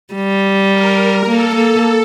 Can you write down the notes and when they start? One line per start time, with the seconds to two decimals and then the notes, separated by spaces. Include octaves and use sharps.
0.14 G3
0.71 A#4
1.26 A#3 A4
1.55 A#3 A4